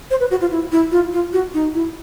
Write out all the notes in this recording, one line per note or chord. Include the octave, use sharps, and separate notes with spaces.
C5
B4
F#4
F4
E4
E4
F4
F4
F#4
D#4
E4